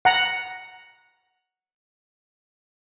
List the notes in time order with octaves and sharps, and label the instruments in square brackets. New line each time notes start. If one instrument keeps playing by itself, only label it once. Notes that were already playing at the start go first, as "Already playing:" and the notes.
[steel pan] F#5 A#5